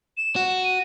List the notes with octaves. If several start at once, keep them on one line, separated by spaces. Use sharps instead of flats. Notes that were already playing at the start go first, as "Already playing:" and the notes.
E7
F#4
D#7